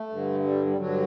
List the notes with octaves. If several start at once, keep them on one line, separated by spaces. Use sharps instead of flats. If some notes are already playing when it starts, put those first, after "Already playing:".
Already playing: A3
G2 D3
G3
G3
G2 D3 F#3